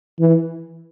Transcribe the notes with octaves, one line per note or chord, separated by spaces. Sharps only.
E3